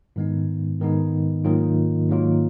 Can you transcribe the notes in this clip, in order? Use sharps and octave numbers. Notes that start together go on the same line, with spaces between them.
G#2 D#3 G#3 B3 D#4
G#2 D#3 G#3 B3 D#4
G#2 D#3 F#3 A#3 F4
G#2 D#3 F#3 A#3 F4